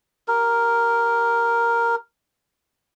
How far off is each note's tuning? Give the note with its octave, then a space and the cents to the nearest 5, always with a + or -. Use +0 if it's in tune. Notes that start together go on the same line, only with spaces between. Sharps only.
G4 -20 A#4 +0